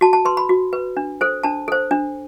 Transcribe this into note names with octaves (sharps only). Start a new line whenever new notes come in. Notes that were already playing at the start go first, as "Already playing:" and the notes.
F#4 A5
A5
B4 C6
B5
F#4
B4
D4
A4 C5
D4 A5
A4 C5
D4